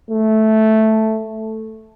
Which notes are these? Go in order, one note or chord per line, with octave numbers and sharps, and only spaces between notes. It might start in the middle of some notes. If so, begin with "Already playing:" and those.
A3